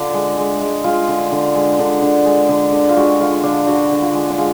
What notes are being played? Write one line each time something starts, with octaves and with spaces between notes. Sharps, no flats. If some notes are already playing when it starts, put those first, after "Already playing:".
Already playing: D3 D4 F4
G#3
G#3
G#3
G#3 F4
D3
D3
G#3
D3
D3
G#3
D3
D3
F4
G#3 F#4
D3 F4
D3 D4
D3 F#4
D3
F4
G#3
D4
G#3 F4